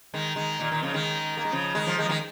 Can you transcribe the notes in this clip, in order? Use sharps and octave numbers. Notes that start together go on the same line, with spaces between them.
D#3 G#3
D#3 G#3
A#2 D#3
A#2 D#3
C#3 F3
D#3 G#3
A#3
G#3
C#3 F3
D#3 G#3
F3
D#3 G#3
F3
D#3 G#3